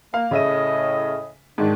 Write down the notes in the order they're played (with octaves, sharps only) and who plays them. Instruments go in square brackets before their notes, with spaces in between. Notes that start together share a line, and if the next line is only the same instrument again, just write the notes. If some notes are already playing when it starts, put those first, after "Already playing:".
[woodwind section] A#3 [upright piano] F5
[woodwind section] A2 D#5 [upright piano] C#3 E5 D#7
[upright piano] G#2 D#3 [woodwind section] D4